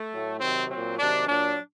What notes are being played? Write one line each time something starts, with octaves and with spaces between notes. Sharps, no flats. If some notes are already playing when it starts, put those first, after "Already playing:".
Already playing: A3
A2 F#3
C3 D#3 F#3 C4
A#2 F#3 C4
C3 D#3 F#3 D4
A#2 F#3 D4